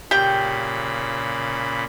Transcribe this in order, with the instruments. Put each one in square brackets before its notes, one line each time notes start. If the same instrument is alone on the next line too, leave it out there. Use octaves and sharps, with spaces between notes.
[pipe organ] A#2 C#3 B5 [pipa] G4 G5